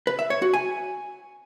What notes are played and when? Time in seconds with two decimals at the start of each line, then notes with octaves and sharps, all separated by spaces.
0.07 B4
0.19 E5
0.30 C#5
0.42 F#4
0.54 G#5